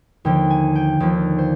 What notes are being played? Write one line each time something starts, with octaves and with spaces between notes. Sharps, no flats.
D#2 D3 F3 G5
G#5
G5
D#2 D3 F3 D5
C5